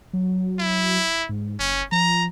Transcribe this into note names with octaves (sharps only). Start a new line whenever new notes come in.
F#3
E4
G#2
F#1 C#4
F3 A#5